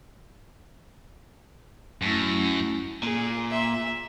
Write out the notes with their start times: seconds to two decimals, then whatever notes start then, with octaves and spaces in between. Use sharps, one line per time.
2.02 F#2 A3 C#4 E4
3.03 A#2 G#4
3.51 E5